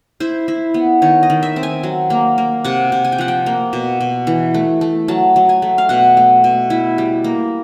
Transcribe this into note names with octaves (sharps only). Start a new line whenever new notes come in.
E4 C5
E4
B3
D#3 C#5
D#5
D#3
E5
C4
G#5
F#3
A#3
A#3
C3 F#5
C3
G#5
G5
F3 F#5
G5
A#3
B2
B2
E3
A3
A3
F#3 A5
F#3
G#5
A3
F5
B2 F#5
A3
B2
E4
G3
A#3